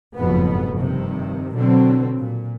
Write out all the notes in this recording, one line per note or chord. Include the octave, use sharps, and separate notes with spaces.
F#1 F2 G#2 B2 B3
G2 C3 D#3
B2 D3 F#3 C4
A#2